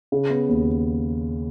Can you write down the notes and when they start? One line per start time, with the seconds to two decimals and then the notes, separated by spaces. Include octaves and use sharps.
0.12 C#3
0.30 B3
0.49 D#2